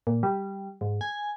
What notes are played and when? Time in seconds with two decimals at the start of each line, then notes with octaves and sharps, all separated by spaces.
0.07 A#2
0.23 G3
0.81 G#2
1.01 G#5